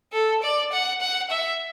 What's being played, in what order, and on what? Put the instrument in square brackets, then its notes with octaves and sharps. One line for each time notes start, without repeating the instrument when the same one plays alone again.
[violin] A4
D5
F#5
F#5
E5